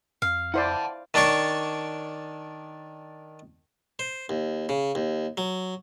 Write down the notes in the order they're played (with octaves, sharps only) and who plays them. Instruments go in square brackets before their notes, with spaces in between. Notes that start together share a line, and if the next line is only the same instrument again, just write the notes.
[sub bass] F2 [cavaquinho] F5
[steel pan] E4 C5 D5 [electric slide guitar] F#5 A5
[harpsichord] D#3 D4 C#5 D5 C#6
C5
D#2
C#3
D#2
F#3